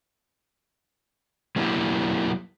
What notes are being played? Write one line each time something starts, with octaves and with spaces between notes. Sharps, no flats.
F#3 A#3 D#4 E4 G4